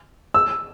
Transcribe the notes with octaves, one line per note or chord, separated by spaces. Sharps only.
E6